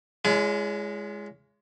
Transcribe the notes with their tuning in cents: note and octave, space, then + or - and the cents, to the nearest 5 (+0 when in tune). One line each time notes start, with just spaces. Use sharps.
G#3 +0 C#4 +30 E4 +45